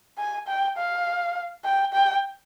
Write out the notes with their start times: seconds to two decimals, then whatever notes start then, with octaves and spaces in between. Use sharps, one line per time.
0.18 G#5
0.47 G5
0.77 F5
1.64 G5
1.93 G5